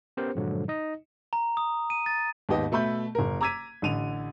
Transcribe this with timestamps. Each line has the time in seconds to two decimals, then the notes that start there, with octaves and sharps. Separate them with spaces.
0.17 B3 C#4 G4 A#4 C5
0.35 G2 A#2 D3 F3 F#3 G#3
0.68 D#4 D#5
1.33 A#5
1.57 D#6
1.90 D#7
2.06 A6
2.49 D#2 G#2 B3 G4 D#5
2.72 B2 A3 E5 B5 G6
3.15 F#1 A#4
3.41 A#5 D6 E6 G#6 B6 D#7
3.82 A1 D3 D#7 F7